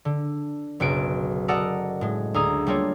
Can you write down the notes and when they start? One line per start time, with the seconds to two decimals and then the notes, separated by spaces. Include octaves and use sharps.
0.05 D3
0.80 F#1 B1 F#4 D7
1.48 F#4 A4 A#4 D5 D#5 F#5
2.01 A2 G#3
2.34 D2 G#4 A#5 D#6
2.67 G3 A3 A#3 F4 C#5